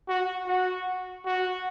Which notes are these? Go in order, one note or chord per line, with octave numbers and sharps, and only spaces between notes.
F#4
F#4
F#4